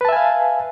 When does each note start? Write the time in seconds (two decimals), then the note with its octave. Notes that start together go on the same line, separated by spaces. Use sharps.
0.01 B4
0.05 A5
0.09 E5
0.12 G#5
0.16 F5